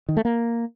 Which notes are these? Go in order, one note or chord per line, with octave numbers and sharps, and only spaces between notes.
D#3
A3
A#3